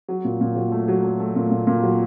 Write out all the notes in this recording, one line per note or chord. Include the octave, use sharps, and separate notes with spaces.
F#3
A#2
A#2
F#3
A3
F#3
A3
A3
A#2
A#2
A#2
F#3